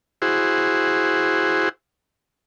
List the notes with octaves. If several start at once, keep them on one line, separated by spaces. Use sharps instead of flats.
E4 F#4 G#4 C5